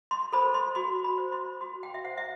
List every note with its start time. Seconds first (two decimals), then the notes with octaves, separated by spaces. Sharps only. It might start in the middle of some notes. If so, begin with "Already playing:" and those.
0.11 C6
0.33 A4 C5 B5
0.54 C6
0.75 F#4 C6
1.04 B5
1.18 C5
1.32 C6
1.61 F#4 C6
1.83 G5
1.94 E5
2.04 C5 F#5
2.18 E5